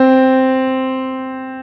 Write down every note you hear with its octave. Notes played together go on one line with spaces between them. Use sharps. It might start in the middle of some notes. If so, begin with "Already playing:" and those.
Already playing: C4